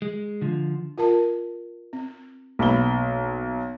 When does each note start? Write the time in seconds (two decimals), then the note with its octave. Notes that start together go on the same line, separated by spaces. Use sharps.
0.02 G#3
0.41 D3 F3
0.98 F4 A#4 A5
1.93 C4
2.59 B1 A#3 B5 G7